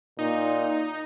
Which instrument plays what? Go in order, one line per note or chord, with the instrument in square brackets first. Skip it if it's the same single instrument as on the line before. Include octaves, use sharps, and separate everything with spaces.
[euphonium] A#2 [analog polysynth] D#4